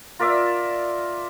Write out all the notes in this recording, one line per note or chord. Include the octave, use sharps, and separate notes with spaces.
F4 A#4 D5 E5